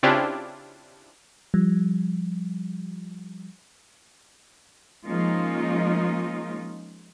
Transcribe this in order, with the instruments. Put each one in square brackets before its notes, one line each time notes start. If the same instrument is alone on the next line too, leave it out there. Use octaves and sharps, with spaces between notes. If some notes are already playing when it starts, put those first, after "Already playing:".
[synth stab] C#3 C4 D4 E4 F4 G4
[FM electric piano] F3 G3
[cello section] F3 G#3 A#3 C#4 D#4 F4